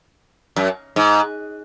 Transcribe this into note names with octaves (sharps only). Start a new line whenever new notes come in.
F#2
G#2